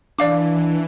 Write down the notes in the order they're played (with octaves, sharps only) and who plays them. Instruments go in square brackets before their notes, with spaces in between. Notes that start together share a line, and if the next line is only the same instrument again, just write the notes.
[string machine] E3 [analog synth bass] D4 [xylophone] D5 F5 D6